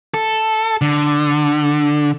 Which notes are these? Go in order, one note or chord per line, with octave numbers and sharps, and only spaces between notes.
A4
D3